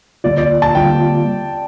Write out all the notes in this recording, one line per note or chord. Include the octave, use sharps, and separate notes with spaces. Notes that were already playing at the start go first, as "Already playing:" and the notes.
D3 G3 A#3 F4 D5
D5
A5
D3 G3 A#3 F4 G5